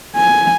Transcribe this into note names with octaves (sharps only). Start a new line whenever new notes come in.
G#5